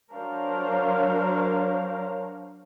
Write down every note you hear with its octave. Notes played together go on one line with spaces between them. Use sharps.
F#3 D4 A#4 C5 C#5 F5